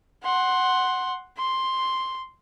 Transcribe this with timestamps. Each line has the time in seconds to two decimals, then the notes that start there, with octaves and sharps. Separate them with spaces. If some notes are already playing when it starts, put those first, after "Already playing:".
0.24 F#5 C6
1.37 C6